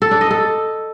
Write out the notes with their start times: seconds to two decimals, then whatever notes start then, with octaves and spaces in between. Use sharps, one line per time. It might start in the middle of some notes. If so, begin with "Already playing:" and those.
0.02 A4
0.11 D4
0.21 D#5
0.31 A4